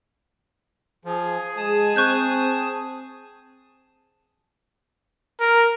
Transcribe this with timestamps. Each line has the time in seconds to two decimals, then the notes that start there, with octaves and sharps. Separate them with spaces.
1.05 F3 G#4
1.57 G#3 A5 D#6
1.96 C4 C#6 F#6 G6
5.40 A#4